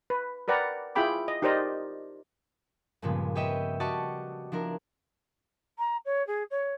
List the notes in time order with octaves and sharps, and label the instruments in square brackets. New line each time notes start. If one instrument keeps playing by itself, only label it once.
[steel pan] B4
A#4 B4 D5 F#5 G5 A#5
E4 F4 G#4 G5 B5 D6
D#5
D#4 G4 A#4 C5 D5 D#5
[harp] G2 A#2 C#3 F3 G#3 B3
G4 B4 C#5 D#5 E5 G5
F#4 G4 D5 D#5 A5 C#6
F3 D4 E4 A#4
[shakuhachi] A#5
C#5
G#4
C#5